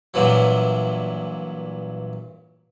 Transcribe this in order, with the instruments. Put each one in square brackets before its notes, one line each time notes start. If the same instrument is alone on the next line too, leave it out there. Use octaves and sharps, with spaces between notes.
[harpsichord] G2 A#2 E3 F#3